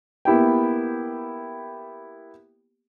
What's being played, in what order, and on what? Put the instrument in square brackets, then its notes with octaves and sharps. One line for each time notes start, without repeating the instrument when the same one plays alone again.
[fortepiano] A#3 B3 E4 G4 G5